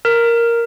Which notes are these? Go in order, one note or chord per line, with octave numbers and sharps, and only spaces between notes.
A#4